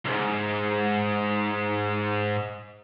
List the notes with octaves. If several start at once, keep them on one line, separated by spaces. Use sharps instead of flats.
C2 G#2